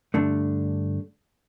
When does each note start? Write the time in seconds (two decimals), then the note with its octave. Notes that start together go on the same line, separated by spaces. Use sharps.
0.14 G2 D3 A3 D4